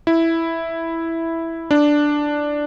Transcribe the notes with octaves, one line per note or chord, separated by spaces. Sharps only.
E4
D4